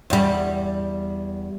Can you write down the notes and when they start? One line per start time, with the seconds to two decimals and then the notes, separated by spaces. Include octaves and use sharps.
0.10 E2 G3